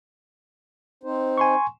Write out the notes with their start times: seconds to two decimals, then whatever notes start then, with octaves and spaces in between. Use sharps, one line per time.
1.04 C4 D#4 C5
1.38 G#5 C6 C#6